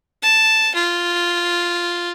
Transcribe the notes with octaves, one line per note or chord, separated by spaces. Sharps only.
A5
F4